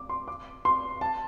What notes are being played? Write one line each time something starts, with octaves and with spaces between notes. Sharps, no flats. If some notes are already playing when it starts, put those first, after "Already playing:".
Already playing: D6
C6
D6
C6
A5